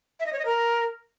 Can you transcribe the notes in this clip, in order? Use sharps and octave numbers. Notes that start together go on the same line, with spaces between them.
E5
D#5
C#5
D#5
A#4